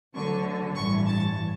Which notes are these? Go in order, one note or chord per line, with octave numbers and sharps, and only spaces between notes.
D2 D3 F#3 C#6
A1 G2 E3 C#6
A5